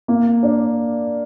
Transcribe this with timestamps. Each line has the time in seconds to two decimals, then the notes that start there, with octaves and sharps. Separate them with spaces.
0.08 A#3
0.43 D4